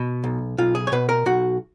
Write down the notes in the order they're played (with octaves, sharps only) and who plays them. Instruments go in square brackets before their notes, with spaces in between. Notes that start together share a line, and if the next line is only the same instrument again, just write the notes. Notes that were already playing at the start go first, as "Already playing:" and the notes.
Already playing: [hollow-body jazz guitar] B2
B1
B1 F4
G#4
C#5
B2 B4
A#4
B1 F#4